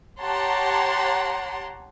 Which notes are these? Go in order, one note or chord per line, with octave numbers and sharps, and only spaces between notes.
G4 C#5 F#5 A5 A#5 C6